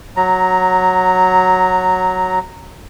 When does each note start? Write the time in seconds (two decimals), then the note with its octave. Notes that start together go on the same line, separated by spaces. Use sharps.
0.16 F#3 A#5